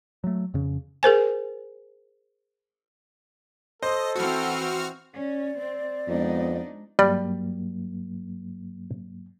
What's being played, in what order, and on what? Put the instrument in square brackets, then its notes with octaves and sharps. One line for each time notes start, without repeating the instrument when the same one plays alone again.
[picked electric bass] F#3 A3
F2 C#3
[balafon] G#4 A#4 C5 G#5
[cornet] A4 [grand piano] C5 [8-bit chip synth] D#5
[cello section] E3 C4 [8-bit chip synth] F#4 F6
[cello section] C#4 [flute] D5
[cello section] C4
[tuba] F2 [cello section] G#3 D4 D#4 [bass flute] B3
[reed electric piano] G2 F#3 A#3 [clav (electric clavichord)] G3 [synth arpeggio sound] D5